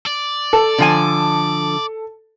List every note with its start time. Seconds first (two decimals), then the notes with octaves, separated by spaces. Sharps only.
0.06 D5
0.53 A4
0.78 D3 F3 G#5